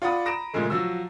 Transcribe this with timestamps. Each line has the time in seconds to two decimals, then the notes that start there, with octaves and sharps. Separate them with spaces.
0.02 F4 D5 F#5 B5 D#6
0.25 A#5 B5 D#6 A#6 D7 E7
0.54 A#2 C#3 F3 G#3 A3
0.70 F3 F#3 F#4 E6